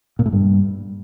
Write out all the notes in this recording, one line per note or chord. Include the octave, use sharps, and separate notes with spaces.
A#2
A2
G2